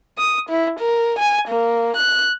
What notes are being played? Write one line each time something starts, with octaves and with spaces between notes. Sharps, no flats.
D#6
E4
A#4
G#5
A#3
F#6